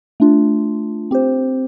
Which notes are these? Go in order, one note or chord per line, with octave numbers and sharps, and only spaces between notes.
A3 D4 F4
C4 G4 C5